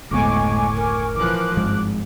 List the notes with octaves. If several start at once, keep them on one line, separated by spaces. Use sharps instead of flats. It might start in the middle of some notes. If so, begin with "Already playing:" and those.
F#1 D2 A2 G#3 B3 G#5 C#6 D6
A#4
E3 F3 D6 F#6
G#1 G2 F3 G#3